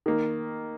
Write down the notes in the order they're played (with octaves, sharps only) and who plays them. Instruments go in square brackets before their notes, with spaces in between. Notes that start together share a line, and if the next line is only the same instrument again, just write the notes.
[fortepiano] D#3 A#3